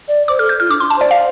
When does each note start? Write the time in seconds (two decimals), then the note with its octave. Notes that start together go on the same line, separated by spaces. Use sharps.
0.08 D5
0.28 C5 D6
0.39 A4 F6
0.49 G6
0.60 F4 F6
0.70 D4 D6
0.80 C6
0.90 A5
0.97 C5 D5
1.11 F5